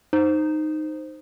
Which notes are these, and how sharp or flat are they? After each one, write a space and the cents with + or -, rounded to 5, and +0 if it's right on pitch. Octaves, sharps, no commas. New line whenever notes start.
D#4 -10 C5 +0